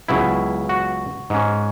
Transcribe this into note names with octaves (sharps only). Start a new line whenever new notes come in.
C#2 C#3 F#3 B3 E4
F#4
G#2 G#3 C#4